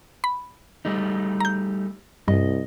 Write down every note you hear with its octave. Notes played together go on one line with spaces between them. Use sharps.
B5
G3 A3 D#4
A#5 G6
C2 G2 D#5